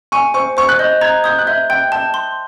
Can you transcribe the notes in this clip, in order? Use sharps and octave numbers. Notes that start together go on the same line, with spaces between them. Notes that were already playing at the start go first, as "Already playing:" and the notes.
G#5 C#6
C5 C#6
C5 C#6
F#6
D#5 G6
A#5 G#6
D#6 G6
F#6
E5 G6
G5 G6
A5 G6
C6